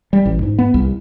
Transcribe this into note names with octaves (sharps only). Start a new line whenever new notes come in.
G3
A1
G#2
B3
C2